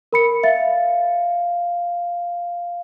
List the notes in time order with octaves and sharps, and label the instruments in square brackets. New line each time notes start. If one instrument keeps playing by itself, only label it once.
[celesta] A#4 B5 C#7
[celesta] E5 A6 [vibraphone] F5